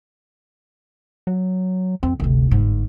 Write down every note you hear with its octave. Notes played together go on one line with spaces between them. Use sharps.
F#3
F2 C4
G1 D2 C3
G1 G#2